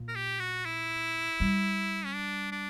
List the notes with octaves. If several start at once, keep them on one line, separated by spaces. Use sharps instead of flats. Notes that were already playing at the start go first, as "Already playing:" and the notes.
Already playing: A#2
A#4
G4
F#4
E4
G3
C#4
D4
D4